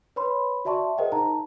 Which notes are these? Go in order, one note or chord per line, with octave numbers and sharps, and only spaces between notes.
B4 C#5 B5 C6
F#4 D5 E5 A5 C6 C#6
G#4 A#4 C5 D#5 F#5 G5
D#4 A5 A#5